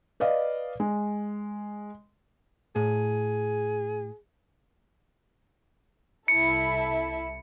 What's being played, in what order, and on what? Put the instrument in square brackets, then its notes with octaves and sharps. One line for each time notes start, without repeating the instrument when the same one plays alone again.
[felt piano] B4 D5 D#5 F5
G#3
[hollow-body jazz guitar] A2 [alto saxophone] G#4
[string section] C2 E4 A4 [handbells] C#7